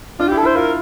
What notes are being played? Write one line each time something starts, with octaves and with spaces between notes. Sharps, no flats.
D4 F4
G4
E4
A4
E4
C5
F4 A#4